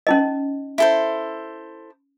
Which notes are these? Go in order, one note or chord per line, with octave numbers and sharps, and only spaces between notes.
C#4 D#4 D#5
E4 A4 C5